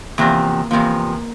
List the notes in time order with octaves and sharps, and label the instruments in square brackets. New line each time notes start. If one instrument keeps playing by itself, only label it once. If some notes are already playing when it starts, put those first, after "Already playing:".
[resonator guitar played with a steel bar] E2 C3 F3 [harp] A#3
[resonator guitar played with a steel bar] E2 C3 F3 [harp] A#3